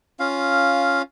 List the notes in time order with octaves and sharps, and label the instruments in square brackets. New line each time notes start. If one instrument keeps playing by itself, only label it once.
[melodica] C#4 F4 F5